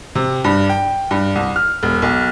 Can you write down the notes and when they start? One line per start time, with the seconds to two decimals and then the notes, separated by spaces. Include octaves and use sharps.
0.15 C3
0.44 G2
0.69 G5
1.11 G2
1.35 C2
1.56 F6
1.83 E1
2.02 B1